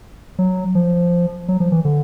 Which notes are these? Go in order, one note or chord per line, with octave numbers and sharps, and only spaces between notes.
F#3
F3
F#3
F3
E3
D3